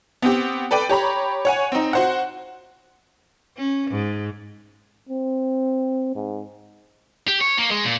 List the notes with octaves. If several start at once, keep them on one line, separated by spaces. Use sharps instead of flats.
B3 C4 G4
A4 B4 D5 G5
G4 C#5 A#5 B5
C#5 F#5 G#5
C4 D#4
F#4 C5 F#5
C#4
G#2
C4
G#2
G4
C#5
A#3
G#3
A#2